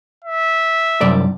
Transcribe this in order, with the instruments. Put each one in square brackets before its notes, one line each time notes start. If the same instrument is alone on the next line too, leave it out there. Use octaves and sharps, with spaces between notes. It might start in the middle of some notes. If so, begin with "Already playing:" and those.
[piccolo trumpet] E5
[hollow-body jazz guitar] C2 F#2 D5